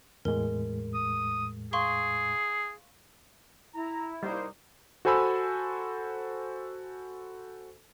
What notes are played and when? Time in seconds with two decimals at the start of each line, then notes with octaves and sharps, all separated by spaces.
0.25 E2 A2 G#3 A#4
0.94 D#6
1.73 G#4 F5 C6 C#6
3.74 E4 A#5
4.23 G3 A#3 D#4 C5
5.05 F#4 A4 C5 G#5 B5 E6